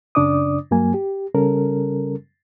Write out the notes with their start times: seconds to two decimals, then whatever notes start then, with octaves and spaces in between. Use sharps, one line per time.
0.15 F#2 C#3 D4 D5 D6 D#6
0.71 G2 F#3 A#3 G#5
0.94 G4
1.35 C#3 G3 C#4 A4 A#4